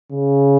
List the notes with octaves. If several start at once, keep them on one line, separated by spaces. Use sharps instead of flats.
C#3